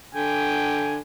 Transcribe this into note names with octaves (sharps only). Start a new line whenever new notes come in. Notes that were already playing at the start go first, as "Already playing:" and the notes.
D3 G5 G#5